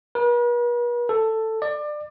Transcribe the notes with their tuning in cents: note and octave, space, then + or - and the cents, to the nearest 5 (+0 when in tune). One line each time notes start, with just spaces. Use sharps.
B4 -45
A4 +10
D5 +25